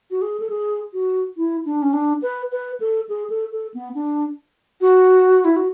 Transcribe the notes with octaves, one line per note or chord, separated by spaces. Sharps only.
F#4
G#4
A4
G#4
F#4
E4
D4
C#4
D4
B4
B4
A4
G#4
A4
A4
B3
D4
F#4
E4
F#4